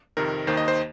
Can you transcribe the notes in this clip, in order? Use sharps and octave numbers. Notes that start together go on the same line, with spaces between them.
F2 C3 D#3 A#4
D#2 D#3 A#3 C5
D#5
C5